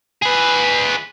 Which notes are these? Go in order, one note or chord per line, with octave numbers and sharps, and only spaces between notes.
G#4 B4